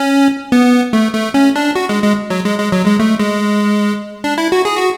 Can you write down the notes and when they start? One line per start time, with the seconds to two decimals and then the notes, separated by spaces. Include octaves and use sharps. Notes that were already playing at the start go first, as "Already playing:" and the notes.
Already playing: C#4
0.52 B3
0.93 A3
1.14 A3
1.34 C#4
1.56 D4
1.76 F#4
1.89 G#3
2.03 G#3
2.30 F#3
2.45 G#3
2.58 G#3
2.72 F#3
2.86 G#3
2.99 A3
3.20 G#3
4.24 D4
4.38 E4
4.52 F#4
4.65 G#4
4.77 F#4